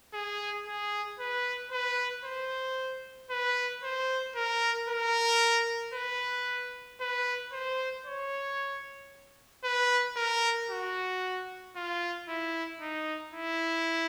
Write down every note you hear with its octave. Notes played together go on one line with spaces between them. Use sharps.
G#4
G#4
B4
B4
C5
B4
C5
A#4
A#4
B4
B4
C5
C#5
B4
A#4
F#4
F4
E4
D#4
E4